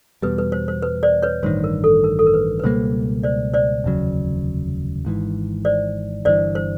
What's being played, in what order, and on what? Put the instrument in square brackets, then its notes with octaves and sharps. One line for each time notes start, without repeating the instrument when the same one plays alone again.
[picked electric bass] E2 B2 G3 [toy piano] B4
[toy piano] B4
C5
C5
B4
C5 D5
B4 C#5
[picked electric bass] A1 G2 D#3 [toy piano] C5
[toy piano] A#4
A4
A#4
A4
A#4
B4
B4
[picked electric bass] C#2 B2 G3 A#3 [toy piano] C5
[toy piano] C5 D5
C5 D5
[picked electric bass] F1 D#2 C#3 F#3
G#1 G#2 E3
[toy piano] C5 D5
[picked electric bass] G1 G2 E3 [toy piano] C5 D5
[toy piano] C5